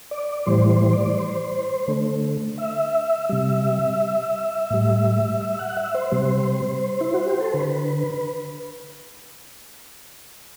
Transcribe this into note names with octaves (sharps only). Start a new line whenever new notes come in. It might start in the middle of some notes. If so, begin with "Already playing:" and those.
D5
A2 E3 G3 C5
C5
D5
C5
D3 A3
E5
C3 G3 E5
A2 G3
E5
F#5
E5
C5
C3 G3
E4
F#4
G4
A4
D3 B4